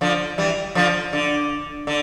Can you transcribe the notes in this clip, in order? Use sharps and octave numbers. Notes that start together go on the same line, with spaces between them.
D3 F3
E3 G3
D3 F3
D3
D3